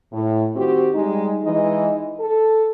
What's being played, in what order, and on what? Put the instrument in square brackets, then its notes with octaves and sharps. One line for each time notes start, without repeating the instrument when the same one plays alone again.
[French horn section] A2
D#3 C4 F#4 G4
G3 G#3 D#4
E3 G#3 D#4 D#5
A4